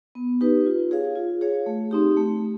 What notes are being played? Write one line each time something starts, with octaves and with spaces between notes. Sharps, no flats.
B3
D#4 G4 B4
F4
G#4 C#5 F5
F4
G#4 C#5 F5
A3
C4 D#4 G4
A3